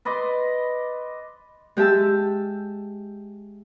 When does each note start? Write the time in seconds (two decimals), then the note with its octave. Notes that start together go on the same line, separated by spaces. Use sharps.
0.05 B4 D5 D#5 C6
1.77 G#3 G4 E5 A5 E6